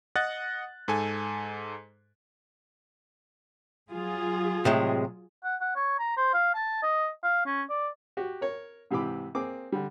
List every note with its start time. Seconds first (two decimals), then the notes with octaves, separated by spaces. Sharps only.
0.16 D#5 F#5 F#6 A6
0.88 G#2 A4 G#5
3.90 F#3 F4 G#4
4.65 A2 C3 G#3
5.44 F#5
5.61 F#5
5.76 C#5
5.99 A#5
6.17 C5
6.34 F5
6.54 A5
6.83 D#5
7.23 F5
7.46 C#4
7.69 D5
8.17 F#4 G4
8.41 A#4 C#5
8.91 G#2 C3 E3 G4 B5 D6
9.35 A#3 C4 G#4 D6
9.72 D3 G3